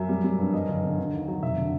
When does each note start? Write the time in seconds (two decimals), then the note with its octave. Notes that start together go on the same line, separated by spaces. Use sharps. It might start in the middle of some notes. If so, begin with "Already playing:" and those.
Already playing: F#2 E5
0.09 G3
0.24 G3
0.38 G2
0.53 F#2 D#5
0.68 G1
0.83 D3
0.98 D3
1.13 D#2
1.28 F#3
1.43 F1 E5
1.57 D3